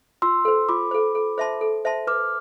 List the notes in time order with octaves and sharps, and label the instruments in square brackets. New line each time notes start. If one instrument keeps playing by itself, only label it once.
[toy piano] F4 [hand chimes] C6 E6
[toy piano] A4 C5
[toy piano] F4 [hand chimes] B5 D6
[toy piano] A4 C5
A4
C5 E5 A5 C6
A4
C5 E5 A5 C6
[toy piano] B4 [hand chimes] D6 F6